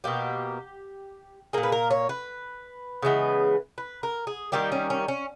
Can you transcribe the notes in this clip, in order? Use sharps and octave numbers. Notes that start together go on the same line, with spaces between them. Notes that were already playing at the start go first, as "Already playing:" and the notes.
B2 A#3 G4
A#2 A#3 G#4
B4
A#4
C#5
B4
C#3 E3 G#3 B3
B4
A#4
G#4
D#3 G3 A#3 G4
C#4
C#4
C#4